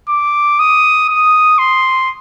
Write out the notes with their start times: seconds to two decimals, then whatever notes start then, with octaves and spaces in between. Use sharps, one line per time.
0.09 D6
0.59 D#6
1.10 D#6
1.58 C6